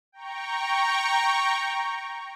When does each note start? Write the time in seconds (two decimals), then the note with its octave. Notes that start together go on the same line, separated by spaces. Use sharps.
0.12 G5 A#5 C#6